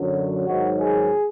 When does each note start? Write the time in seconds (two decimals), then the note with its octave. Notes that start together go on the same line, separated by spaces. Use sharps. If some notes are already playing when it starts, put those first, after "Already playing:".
Already playing: F#2 D3 F#3
0.47 G#2 D#3 F#3 F#4
0.80 G#4